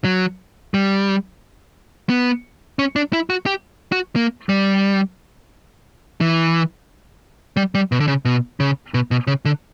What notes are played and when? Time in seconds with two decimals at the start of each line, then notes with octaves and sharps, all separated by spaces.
0.04 F#3
0.74 G3
2.10 B3
2.79 C#4
2.96 D4
3.13 E4
3.30 F#4
3.46 G4
3.92 F#4
4.16 A#3
4.49 G3
6.21 E3
7.57 G3
7.75 G3
7.92 B2
8.00 D3
8.08 C#3
8.25 B2
8.60 C#3
8.94 B2
9.11 B2
9.27 C#3
9.45 D3